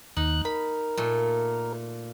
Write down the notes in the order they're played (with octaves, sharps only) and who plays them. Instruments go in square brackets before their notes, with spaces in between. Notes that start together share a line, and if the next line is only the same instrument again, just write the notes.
[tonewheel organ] D#2 F#6 [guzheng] D#4
[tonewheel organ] A#4 [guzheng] B5
[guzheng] A#2 A3